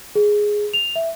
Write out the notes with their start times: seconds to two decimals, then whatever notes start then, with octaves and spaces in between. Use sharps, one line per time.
0.15 G#4
0.74 F7
0.96 E5